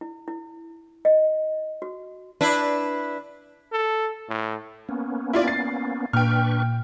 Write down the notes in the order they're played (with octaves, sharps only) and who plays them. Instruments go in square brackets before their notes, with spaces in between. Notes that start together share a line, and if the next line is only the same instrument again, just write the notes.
[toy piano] E4
E4
D#5
F#4
[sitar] D4 E4 B4
[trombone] A4
A2
[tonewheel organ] A#3 B3 C#4
[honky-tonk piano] E4 F4 D5
A6 C7
[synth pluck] A#2 [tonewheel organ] D4 B4 C#6 [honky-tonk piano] G5 F6